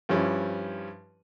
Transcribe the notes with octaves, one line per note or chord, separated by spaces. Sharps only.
G2 F3 G3 C#4 E4